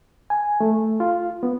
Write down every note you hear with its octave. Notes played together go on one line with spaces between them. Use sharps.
G#5
A3
F4
B3